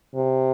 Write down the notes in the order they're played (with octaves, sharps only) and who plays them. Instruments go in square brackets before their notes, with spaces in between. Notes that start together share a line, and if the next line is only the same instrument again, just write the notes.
[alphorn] C3